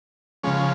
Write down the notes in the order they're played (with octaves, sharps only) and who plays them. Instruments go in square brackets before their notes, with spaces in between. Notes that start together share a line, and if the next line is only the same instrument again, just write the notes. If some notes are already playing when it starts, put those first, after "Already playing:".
[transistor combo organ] C#3 F3 G#3 C#4